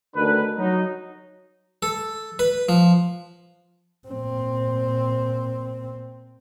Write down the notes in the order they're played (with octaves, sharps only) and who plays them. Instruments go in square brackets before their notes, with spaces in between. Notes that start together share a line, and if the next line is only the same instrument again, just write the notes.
[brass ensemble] D2 D#3 D4 B4
F#3 D#4
[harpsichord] A4
B4
F3
[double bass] A#2 C4